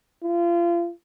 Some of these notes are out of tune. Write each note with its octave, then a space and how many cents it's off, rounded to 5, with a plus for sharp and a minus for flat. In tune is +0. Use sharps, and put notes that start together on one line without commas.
F4 -30